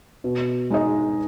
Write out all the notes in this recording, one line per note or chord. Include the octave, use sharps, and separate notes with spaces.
B2
G#3 D#4 G#4 D#5